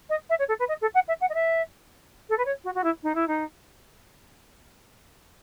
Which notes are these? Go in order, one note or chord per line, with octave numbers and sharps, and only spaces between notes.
D#5
E5
C#5
A4
B4
D#5
A4
F#5
E5
F#5
D#5
E5
A4
B4
C#5
F#4
F#4
E4
D#4
E4
D#4